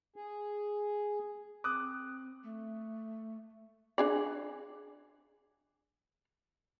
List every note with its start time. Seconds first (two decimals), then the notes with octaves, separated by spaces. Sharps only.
0.16 G#4
1.64 C4 D6 D#6 F#6
2.44 A3
3.98 D4 G#4 D5